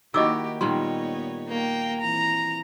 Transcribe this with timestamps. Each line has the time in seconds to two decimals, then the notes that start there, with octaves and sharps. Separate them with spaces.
0.14 D#3 A#3 E4 F#4 G4 D#5 D6 E6
0.61 A#2 D#3 G3 B3 D#4 C#5 C6
1.48 A#3 G5
2.01 E3 C4 A#5